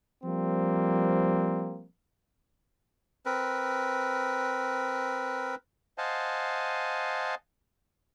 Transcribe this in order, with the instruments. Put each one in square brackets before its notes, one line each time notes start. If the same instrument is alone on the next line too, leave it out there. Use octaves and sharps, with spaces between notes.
[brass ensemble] F3 G3 A#3 C4
[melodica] C4 A#4 B4
[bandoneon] C5 D#5 F5 F#5 G#5 A5